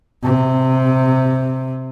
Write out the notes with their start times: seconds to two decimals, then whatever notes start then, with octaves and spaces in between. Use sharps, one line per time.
0.23 C3